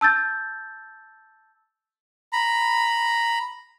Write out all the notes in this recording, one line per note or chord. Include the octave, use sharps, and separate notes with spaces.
A5 E6 G6 A6
A#5 B5